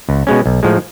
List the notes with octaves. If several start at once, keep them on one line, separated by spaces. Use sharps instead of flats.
C#2
B2 G#3 C#4
B1
A2 F3 G#3